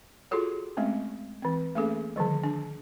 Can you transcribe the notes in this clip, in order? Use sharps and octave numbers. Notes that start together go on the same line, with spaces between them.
F4 F#4 G#4 A4 C#5
G#3 A3 C4 C#4
E3 C4
A3 A#3 C#4 G#4 A4
D3 D#3 F3 G3
D4